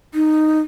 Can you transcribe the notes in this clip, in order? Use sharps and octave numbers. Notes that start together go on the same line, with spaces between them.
D#4